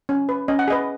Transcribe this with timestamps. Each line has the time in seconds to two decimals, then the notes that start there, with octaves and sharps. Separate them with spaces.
0.09 C#4
0.29 B4
0.48 C#4 D#5
0.59 F#5
0.68 G#4 B4 D#5